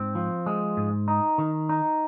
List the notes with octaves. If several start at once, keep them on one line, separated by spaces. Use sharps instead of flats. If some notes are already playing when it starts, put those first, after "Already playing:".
Already playing: G#2 C4
F3
G#3
G#2
D#4
D#3
D#4